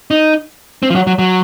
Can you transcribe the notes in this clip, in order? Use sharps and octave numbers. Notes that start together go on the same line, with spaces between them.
D#4
C4
F3
F#3
F#3
F#3